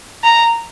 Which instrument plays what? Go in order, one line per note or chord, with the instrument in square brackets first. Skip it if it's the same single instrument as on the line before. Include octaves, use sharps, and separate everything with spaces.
[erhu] A#5